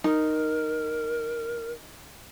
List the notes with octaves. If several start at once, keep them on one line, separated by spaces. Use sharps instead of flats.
D#4 A#4